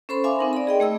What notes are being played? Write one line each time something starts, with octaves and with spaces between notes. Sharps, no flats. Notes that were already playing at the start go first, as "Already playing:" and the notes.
C#4 A4 C5 B5 C6
E5 F5 G#5 B5 C6 D6
C4 D#4 A#4
D5 B5
G#4 D#5 G5
A3 G#4 E6